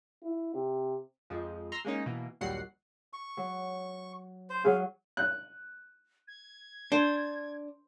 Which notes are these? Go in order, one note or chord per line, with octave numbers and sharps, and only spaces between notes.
E4
C3
F2 F3 G#3
A#5 C6 E6 F6
G#3 A#3 C#4 D#4
B2 E3 A#3
A#1 D#2 F#3 G3 F#5 C7
C#6
F#3
C5
F#3 G#4 F5
F#6
G#6
D4 C5